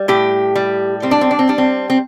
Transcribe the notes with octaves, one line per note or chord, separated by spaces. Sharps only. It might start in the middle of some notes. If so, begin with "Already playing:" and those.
Already playing: G3
A2 G4
G3
G3 C4
D4
C4
D4
C4
G3 D4
C4
C4